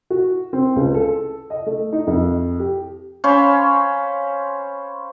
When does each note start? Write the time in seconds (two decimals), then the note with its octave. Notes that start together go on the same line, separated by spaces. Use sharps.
0.10 F#4
0.53 C4
0.76 C#2
0.94 A4
1.50 D#5
1.66 A3
1.93 D#4
2.07 F2
2.59 G4
3.24 C#4 C5 F5 B5